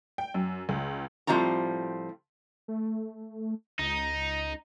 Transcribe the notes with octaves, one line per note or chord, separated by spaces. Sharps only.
G5
F#2
C#2
A2 F3 G3 C4 F4 A#5
A3
C#2 D#4